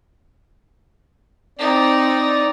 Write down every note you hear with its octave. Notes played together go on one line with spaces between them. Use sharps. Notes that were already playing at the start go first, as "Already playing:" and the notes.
C4 D#4 D5